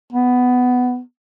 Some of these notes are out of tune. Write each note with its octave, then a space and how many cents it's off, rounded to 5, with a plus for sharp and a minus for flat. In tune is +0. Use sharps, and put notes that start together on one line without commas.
B3 +10